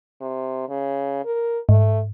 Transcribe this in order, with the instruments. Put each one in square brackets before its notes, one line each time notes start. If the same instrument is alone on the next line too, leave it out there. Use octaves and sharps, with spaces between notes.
[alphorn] C3
C#3
A#4
[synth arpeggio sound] G#2 [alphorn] A3